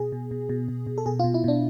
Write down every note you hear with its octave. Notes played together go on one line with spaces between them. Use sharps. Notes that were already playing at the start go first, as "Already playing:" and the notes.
Already playing: B2 G#4
B2
B2
B2
B2
B2
A4
B2 G#4
F4
B2
E4
B2 D4